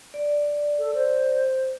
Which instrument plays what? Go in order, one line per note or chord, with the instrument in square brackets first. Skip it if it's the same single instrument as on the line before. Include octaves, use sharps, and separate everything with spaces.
[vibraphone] D5
[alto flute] A4
C5